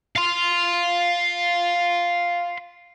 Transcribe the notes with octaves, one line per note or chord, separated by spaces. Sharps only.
F5 C6